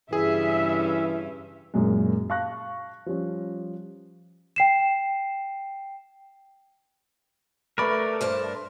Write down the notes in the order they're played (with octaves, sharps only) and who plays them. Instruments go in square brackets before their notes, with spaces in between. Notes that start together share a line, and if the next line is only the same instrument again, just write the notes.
[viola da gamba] G2 C#3 C#4 [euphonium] E3 [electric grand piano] G#4 [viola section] E5
[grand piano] F#2 A#2 G#3
F5 A5 C#6 F#6 A#6
F3 G3 C#4
[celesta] G5 C7 E7
[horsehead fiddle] A3 [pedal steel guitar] A#4 D5 [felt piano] B4 B5 C#6
[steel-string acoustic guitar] G2 C5 A5